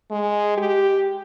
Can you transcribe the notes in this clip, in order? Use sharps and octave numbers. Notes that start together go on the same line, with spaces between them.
G#3
G4